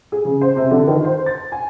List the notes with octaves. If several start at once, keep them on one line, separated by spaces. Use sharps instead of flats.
G#4
C#3
C5
C3
D3
D#3
C5
A6
G#5